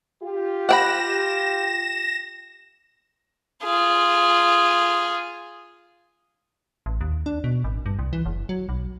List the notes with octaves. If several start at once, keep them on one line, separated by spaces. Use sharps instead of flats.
F4 G4
F#5 G5 B5 A#6 E7
F4 G#4
A1
D#2
D4
B2
G#1
G2
C2
E3
F#1
F#3
B1